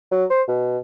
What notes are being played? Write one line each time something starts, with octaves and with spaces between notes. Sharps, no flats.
F#3
C5
B2